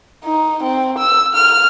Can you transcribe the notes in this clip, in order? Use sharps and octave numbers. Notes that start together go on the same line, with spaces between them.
D#4
C4
E6
F6